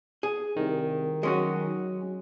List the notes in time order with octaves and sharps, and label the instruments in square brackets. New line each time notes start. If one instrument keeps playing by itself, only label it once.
[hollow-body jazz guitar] G#4
[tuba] C2 [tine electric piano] D#3
[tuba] F#3 [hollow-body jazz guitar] G#3 C#4 F#4